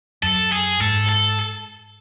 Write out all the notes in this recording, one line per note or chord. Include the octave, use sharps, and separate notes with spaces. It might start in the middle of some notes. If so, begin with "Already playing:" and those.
F#2 A4
G#4
G#2 A4
A4